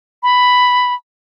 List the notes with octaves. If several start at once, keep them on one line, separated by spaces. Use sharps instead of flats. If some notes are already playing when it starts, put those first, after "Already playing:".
B5